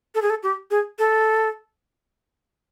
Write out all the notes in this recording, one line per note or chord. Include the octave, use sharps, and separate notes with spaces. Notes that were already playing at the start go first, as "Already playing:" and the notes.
A4
G#4
A4
G4
G#4
A4